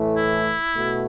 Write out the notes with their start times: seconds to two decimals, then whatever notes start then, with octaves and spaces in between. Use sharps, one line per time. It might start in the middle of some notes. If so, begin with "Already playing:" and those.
Already playing: A2 E3 A3
0.16 E4
0.75 B2 A3 F#4